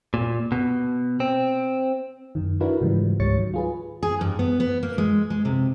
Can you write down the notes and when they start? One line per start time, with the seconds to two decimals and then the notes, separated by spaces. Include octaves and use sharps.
0.14 A#2
0.52 B2
1.20 C4
2.35 F#2 D#3
2.60 D4 E4 F#4 A#4 B4
2.81 G#2 C#3 E3 F3 G3 G#3
3.20 C#2 G#2 G3 C#5 A6 C#7
3.37 D#3 F#3
3.54 F4 G#4 B4
4.03 G#4
4.21 G2
4.39 B3
4.60 B3
4.83 A#3
4.98 G#3
5.30 G#3
5.45 C3